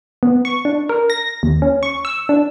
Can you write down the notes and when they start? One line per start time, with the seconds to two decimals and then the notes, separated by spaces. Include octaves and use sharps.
0.23 B3
0.45 C#6
0.65 D4
0.89 A#4
1.10 A#6
1.43 D#2
1.62 C#4
1.83 C#6
2.05 E6
2.29 D4